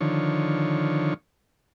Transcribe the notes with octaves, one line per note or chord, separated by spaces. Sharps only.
D3 D#3 F3 C#5